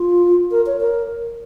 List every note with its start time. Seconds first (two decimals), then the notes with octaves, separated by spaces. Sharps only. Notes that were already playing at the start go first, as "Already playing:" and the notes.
Already playing: F4
0.51 A#4
0.66 C#5
0.81 A#4